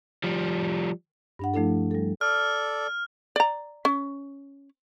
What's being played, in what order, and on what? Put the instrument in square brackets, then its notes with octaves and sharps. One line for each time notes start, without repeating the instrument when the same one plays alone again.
[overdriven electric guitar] F3 G3
[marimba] G2 D4 F#5
F3 A3 D4 E4 A4
G3 A4
[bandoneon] A4 D5 [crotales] F6
[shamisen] D5 A#5
C#4